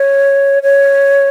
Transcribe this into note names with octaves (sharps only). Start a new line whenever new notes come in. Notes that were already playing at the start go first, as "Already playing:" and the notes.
Already playing: C#5
C#5